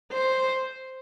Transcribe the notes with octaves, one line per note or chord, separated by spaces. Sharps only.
C5